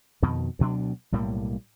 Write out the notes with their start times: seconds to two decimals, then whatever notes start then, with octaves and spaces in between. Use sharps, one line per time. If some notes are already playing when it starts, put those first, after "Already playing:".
0.22 F2 B2 D#3
0.59 D2 B2 F#3 D4
1.12 B1 A2 G3 A#3